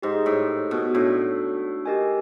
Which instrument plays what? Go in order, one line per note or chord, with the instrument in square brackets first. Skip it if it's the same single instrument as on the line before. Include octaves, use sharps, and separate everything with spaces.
[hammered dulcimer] G#2 [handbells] G4 C5 D#5
[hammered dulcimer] A2
B2
[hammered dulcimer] A2 [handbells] D4 F#4 A4
[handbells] G4 A#4 D#5 G#5